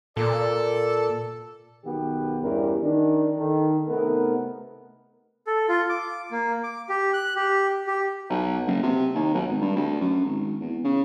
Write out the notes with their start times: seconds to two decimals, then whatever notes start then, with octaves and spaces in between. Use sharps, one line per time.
0.17 A#2 A4 D5
1.85 B1 D#3 B3 F#4 G4
2.42 E2 G2 E3 G3 C#4 A#4
2.82 D#3 D4 D#4
3.37 D#3 A4
3.88 C3 A3 B3 D#4 A#4
5.47 A4
5.69 F4
5.89 D6
6.31 A#3
6.63 D6
6.89 G4
7.14 F#6
7.36 G4
7.87 G4
8.30 B1
8.67 F#1
8.83 C3
9.15 D#2
9.34 B1
9.47 G#1
9.61 G2
9.76 D2
10.01 F#2
10.25 G#1
10.60 E2
10.84 C#3